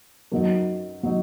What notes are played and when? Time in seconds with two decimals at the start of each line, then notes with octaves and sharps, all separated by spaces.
0.32 F#2 F#3 D#4
1.03 F#3 D#4